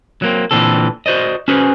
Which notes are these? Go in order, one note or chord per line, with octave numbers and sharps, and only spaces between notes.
F#3 A#3 C4
A#2 D3 E3 C4 A4
F#4 C5 D5 D#5
C#4 F#4 G#4 B4 C5